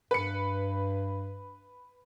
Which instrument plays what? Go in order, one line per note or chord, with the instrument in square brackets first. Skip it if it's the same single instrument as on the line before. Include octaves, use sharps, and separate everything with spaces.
[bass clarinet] G2 [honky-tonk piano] B4 C#7